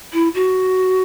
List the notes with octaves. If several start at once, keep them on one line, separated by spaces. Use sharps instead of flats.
E4
F#4